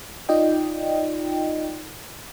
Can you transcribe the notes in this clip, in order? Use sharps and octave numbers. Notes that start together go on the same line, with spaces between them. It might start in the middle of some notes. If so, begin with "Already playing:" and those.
D#4 F4 D5 D#5 G5